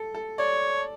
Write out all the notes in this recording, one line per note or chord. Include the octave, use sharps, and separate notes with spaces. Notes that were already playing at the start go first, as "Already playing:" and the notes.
Already playing: A4
A4
C#5 D5